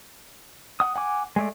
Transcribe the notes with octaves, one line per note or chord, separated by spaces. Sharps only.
F#5 D#6
F#5 G#5 D6
G#3 A3 D5